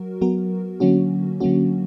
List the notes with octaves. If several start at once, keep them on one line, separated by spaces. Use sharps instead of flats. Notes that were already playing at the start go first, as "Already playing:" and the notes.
Already playing: F#3 F#4 A#4
F#3 B3 F#4 A#4
D3 F#3 A#3 C#4 F#4
D3 F#3 A#3 C#4 F#4